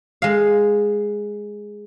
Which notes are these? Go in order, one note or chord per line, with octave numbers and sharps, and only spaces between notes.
G#3 F5